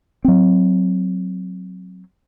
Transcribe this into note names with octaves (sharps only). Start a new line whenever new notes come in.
F#3 C4